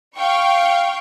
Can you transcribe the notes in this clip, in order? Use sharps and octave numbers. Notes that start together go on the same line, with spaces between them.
F5 G5 C#6